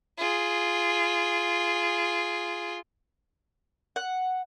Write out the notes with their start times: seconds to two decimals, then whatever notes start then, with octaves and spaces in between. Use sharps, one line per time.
0.18 F4 G#4
3.96 F#5